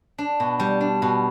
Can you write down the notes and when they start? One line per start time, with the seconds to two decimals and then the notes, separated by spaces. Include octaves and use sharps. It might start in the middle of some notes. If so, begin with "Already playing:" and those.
0.18 D4
0.40 B2
0.60 G3
0.81 D4
1.02 B2